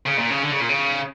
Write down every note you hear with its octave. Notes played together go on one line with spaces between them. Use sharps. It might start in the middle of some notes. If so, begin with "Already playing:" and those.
C#3
A#2
C#3
D3
C#3
A#2
C#3